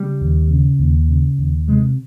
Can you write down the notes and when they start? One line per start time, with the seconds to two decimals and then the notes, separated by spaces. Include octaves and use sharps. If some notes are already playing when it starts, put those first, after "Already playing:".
Already playing: C#3 G3
0.21 D#2
0.50 C#3
0.79 D#2
1.09 C#3
1.38 D#2
1.68 C3 G#3